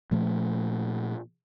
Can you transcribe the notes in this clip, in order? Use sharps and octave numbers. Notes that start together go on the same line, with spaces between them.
A#2 F3 A3